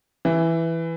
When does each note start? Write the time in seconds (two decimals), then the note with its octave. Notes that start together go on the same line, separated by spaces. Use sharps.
0.25 E3